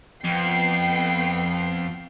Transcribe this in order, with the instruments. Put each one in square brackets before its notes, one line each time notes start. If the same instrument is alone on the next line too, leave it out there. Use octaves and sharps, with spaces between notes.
[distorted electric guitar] F2 [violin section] B3 G5 C7